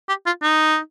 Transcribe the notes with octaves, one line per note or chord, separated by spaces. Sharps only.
G4
F4
D#4